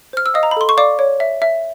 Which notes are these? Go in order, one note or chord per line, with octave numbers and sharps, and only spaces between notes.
C5 F6
E6
D#5 F5 D#6
A#5
B5
A4 C6
C#6
D5 F5 D6
C#5
E5
E5